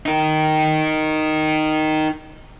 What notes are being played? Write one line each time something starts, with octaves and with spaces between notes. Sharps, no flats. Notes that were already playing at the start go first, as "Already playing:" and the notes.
D#4 A#4